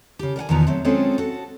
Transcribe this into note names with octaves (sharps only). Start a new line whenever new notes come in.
C#3 G4
A#4 D5 F#5 G#5
E2 B2 D#3 F3 B3 A#5
F#3 A3 C4
G#3 C4 C#4 F4 G#4 A4
F#4 A4